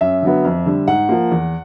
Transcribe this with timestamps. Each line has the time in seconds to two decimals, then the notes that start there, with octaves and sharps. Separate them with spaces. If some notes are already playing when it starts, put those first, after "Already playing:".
0.01 F#2 E5
0.22 D3 F#3 B3
0.45 F2
0.66 D3 G3
0.88 G#2 F#5
1.09 F3 A#3
1.31 E2